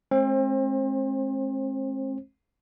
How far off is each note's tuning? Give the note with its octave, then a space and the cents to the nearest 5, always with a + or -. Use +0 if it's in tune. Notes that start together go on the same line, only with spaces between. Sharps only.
G#3 +45 C4 +40 C5 +25